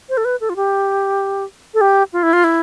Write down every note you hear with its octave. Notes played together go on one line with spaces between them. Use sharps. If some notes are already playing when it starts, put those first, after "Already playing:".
C5
A4
B4
A4
F4
G4
A4
G4
F4
E4
F4
E4